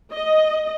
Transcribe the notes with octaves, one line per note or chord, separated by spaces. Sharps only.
D#5